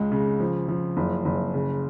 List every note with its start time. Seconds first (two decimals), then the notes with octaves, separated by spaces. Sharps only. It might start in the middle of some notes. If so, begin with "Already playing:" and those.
Already playing: C#2 G#3
0.12 C#3
0.40 F3
0.68 F3
0.97 F#1
1.25 F#1
1.54 C#3